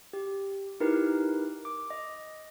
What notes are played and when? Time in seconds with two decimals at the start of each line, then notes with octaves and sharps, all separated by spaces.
0.13 G4
0.80 D#4 E4 G4 A#4 B4
1.65 D6
1.90 D#5